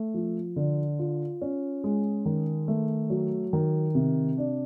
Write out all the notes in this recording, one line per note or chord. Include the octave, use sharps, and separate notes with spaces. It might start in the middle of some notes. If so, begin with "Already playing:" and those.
Already playing: A3
F3
D3
F4
C#4
G#3
D#3
A3
F#3
D#3
C3
D4